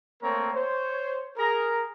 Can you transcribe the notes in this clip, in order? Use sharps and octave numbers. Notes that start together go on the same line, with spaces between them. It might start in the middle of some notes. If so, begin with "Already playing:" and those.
A3 A#3 C4 A#4 C#5 A#5
C5 C#5
G#4 A#4 A#5